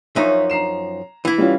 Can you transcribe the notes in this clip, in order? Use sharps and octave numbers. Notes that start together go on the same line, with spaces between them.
F#2 F3 D#4 C#5 E5
A#5 C7 E7
E3 E4
G3 C#4 F4